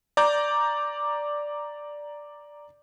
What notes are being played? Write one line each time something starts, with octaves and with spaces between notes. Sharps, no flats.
D5 A#5 D6 G6